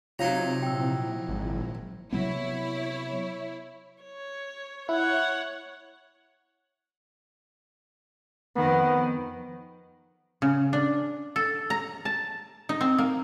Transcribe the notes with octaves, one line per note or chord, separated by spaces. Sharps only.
C3 F#3 D#4 F4 C#5 F5 A#5
A#2 F3 E4 G5 E6
G#1
C3 F#3 B3 E4 C#5
C#5
E4 C#5 F#5
F2 D#3 B3
C#3
D4
A4
A#5
A5
D#4
C4
A#3